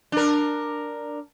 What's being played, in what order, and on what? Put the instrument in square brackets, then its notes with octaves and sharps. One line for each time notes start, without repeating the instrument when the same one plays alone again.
[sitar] D4 A#4